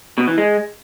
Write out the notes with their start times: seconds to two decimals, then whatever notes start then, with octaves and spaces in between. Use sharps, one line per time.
0.18 B2
0.28 E3
0.38 G#3